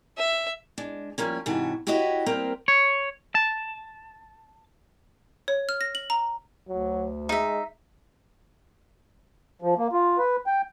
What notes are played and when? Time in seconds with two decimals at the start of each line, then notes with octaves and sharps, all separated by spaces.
0.18 E5
0.78 G#3 D4
1.18 F3 G3 A#3 C#4
1.46 G#2 C3 E3 F#4 C#5 A5
1.87 E4 F#4 G4 C#5 D#5 E5
2.26 G3 A#3 C4 A#4 C5 E5
2.68 C#5
3.35 A5
5.48 C#5
5.69 F6
5.81 A#6
5.95 F#7
6.10 A#5
6.68 D2 F#3
7.29 G#3 D#4 E5
9.62 F3
9.78 A#3
9.92 F4
10.18 B4
10.47 G5